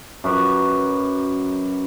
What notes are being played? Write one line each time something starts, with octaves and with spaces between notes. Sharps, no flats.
F#2 B4 D6